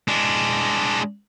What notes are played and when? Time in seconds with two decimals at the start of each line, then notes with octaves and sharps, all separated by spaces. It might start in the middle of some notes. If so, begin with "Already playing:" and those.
0.08 G#3 D4